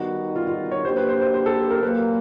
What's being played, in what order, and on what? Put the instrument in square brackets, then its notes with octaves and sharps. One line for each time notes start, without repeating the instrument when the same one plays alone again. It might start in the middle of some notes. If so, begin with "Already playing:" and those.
Already playing: [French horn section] D#3 G3 B3 D#4 [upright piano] F#4
[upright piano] F4
F4
C#5
[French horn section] F#3 A#3 D4 G4 [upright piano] C5
[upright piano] B4
C5
C5
C5
A4
A#4
[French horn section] A#2 F#3 A#3 [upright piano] B4